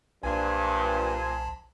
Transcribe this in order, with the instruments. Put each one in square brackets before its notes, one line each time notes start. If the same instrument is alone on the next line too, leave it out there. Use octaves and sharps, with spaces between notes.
[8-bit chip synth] B1 A5 [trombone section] G2 [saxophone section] A#2 C5 [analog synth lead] G#5